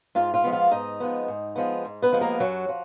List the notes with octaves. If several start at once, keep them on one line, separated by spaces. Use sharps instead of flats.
G#2 F4 F5
F4 F5
F3 G#3 B3
F4 F5
G#2 D#4 D#5
F3 G#3 B3
G#2
F3 G#3 B3
G#2
B3 B4
F3 G#3 B3
A#3 A#4
F#2 F#3 F#4
F3